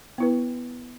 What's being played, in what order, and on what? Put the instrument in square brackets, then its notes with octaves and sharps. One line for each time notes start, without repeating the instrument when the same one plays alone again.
[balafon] B3 E4 B4